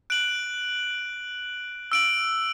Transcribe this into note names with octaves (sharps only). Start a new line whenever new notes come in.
F#6 D7 F#7
E6 D7 F#7